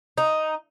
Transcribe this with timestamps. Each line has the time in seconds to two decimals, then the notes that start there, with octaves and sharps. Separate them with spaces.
0.18 D#4